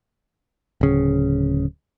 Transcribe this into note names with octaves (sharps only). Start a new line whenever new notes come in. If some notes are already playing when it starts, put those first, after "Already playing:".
D1 C#3